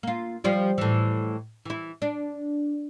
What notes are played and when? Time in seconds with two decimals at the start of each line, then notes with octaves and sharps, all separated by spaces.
0.03 A#3 F4
0.44 F3 G3 F4
0.78 A2 E3
1.66 E3 E4
2.02 D4